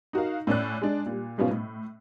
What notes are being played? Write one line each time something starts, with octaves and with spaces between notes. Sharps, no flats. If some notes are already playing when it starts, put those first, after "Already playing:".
D#4 F#4 A#4 F5
A2 C#4 D5 F#6
G#3 D4 D5
A#2 G3
G#2 B2 F#3 B3 C#4 F4
A2